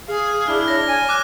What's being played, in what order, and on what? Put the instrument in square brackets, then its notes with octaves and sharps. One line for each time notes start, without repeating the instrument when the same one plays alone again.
[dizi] G#4 [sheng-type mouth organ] F5
[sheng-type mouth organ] D4 E4 [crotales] F6
[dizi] C#5 [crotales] A#6
[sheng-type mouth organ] G#5
[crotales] D6 F#6